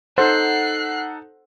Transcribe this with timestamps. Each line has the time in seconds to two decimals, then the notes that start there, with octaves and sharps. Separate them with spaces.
0.18 D#4 A4 C5 F#5 F#6 C7